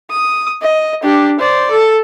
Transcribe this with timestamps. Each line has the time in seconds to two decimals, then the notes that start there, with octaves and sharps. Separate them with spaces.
0.10 D#6
0.62 D#5
1.03 D4 G4
1.39 C5 D5
1.71 A4